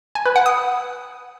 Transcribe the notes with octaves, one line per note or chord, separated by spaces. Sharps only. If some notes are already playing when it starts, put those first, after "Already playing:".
G#5
B4
F#5
D#6